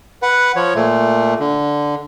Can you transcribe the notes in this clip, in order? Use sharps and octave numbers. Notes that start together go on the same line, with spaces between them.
B4 F#5
F3 C#5
A#2 A3
D3